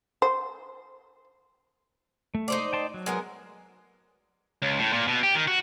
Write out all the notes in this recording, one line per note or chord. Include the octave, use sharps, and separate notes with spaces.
C5
A3
D#4 C5 D5
G5 A5 C6
F#3
G#3 B3 A#4
C#2
A2
A#2
B2
G4
D#3
F#4